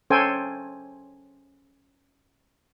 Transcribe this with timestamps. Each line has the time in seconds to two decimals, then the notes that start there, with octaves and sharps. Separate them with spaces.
0.10 C#4 A4 C5 G5 G#5